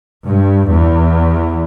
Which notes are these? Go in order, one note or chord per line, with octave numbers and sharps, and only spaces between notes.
G2
E2